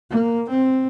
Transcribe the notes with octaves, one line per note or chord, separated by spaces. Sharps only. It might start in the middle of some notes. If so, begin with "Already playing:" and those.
A#3
C4